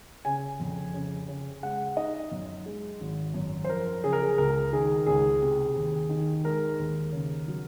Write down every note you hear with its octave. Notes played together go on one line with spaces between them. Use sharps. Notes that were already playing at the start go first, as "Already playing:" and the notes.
C#3 G#5
F2
C#3
C#3
G#3 F#5
D#4 D#5
F#2
G#3
G#1
F#2
C5
F3 A#4
C#3 G#4
A#4
G#4
C#2 A#4
D#3 G#4
C#2 G#4
C3
D#2
D#3
G#3 A#4
D#2
C#3
F#3